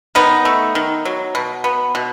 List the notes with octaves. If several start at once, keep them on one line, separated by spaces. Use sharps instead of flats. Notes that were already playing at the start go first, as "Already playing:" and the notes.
D#3 B3 D#4
A3
D#3
F#3
B2
B3
B2